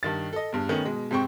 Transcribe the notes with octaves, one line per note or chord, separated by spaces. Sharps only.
G2 D#3 A6
A4 D#5
E2 G2
D#3 A3 B3 C#4
B2 G#3
G#2 C3 C4 G5 C#6